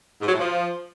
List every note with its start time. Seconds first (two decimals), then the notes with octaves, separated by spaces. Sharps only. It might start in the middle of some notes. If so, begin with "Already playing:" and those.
0.21 G#2
0.27 F#3
0.33 A2
0.39 F3